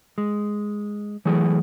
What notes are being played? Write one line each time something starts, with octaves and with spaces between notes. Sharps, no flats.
G#3
E3 F#3 A3 G#4